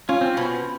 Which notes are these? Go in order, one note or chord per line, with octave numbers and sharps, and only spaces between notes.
C#4 F4
C4
B2 C#4